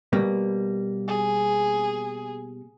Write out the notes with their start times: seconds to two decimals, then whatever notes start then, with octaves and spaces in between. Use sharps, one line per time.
0.13 B2 G3 A#3
1.08 G#4